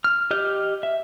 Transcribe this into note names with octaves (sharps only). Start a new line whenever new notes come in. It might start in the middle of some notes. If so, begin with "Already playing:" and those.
F6
G4 D#5 F6 G6
E5